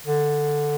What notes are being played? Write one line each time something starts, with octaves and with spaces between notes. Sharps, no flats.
D3